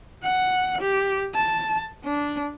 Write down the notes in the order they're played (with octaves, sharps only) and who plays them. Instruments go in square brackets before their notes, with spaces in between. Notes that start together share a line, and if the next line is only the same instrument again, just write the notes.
[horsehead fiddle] F#5
G4
A5
D4